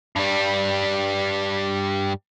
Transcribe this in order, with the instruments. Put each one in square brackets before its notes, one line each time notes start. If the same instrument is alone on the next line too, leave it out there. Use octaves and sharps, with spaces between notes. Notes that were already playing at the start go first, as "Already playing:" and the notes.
[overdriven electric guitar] G2 G3